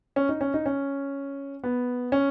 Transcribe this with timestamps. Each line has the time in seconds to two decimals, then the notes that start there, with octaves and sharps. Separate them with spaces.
0.16 C#4
0.29 D#4
0.41 C#4
0.54 D#4
0.66 C#4
1.64 B3
2.12 C#4